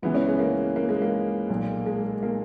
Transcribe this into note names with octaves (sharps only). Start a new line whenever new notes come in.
C#2 C#3 E3 B3
C#4
G#3 B3
A#3
A#3
G#3
A#3
B1 A#2
G#3
A#3